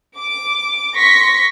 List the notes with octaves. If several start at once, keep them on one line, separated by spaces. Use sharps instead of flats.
D6
C6 C#6 A#6 B6